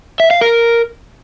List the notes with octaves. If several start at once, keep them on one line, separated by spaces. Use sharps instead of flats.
E5
F5
A#4